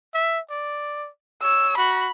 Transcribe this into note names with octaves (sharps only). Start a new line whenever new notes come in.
E5
D5
C#5 E6
F#4 B5